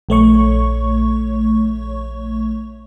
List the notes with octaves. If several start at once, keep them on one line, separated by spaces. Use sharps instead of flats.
A#1 A3 C#5 C#6